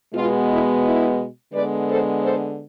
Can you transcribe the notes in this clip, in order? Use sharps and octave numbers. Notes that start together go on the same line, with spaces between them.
B2 G#3 B3 F4
E4
E4
D3 G#3 B3 B4 D5
A4 C5
A4 C5